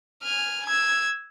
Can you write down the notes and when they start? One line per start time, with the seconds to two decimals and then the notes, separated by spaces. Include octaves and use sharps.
0.23 G#5 F6
0.66 E6 G#6